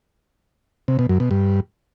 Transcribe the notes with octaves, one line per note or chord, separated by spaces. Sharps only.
C3
B2
F#2
B2
G2